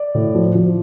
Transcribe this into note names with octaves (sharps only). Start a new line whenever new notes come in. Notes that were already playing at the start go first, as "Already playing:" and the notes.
Already playing: D5
A2
F3
F3